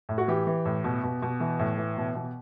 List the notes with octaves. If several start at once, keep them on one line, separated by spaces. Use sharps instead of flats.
A2
F#4
E3 G4
E3
A2
B2
B2
B2
E3
A2
E3
B2
B2